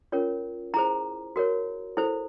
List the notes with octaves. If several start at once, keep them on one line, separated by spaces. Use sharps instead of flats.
C#4 F4 A#4 C#5
E4 G#4 C5 A#5
F#4 A#4 C#5
E4 A4 C5